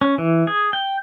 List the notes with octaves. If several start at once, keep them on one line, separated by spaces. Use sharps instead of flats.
C#4
E3
G#4
G5